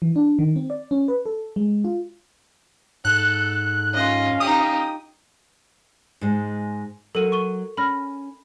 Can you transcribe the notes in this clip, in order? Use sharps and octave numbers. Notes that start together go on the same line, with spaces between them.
E3
D4
D#3
C4
D5
C#4
B4
A4
G#3
F4
G#2 A4 F#6
C#4 F4 D#5 F5
D#4 G4 D#6
G#2 G#3
F#3 F#4 A4 A#4 D#7
C#6 D#7 G7
C#4 B5 F6 A#6